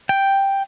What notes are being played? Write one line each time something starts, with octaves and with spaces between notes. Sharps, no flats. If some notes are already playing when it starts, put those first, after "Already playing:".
G5